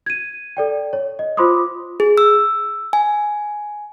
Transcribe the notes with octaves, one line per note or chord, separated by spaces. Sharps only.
G#6 D#7
A4 D5 G5
C#5
D#5
F4 C5 B5 C6 D6 D#6
G#4
E6
G#5